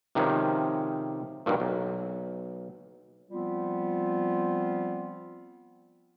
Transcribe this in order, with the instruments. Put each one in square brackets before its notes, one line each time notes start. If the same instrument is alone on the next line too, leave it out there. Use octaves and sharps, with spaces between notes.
[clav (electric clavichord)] C3 D#3 F3 G#3 C#4
G2 A#2 D#3 F#3
B1
[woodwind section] F3 G3 B3 C4 F4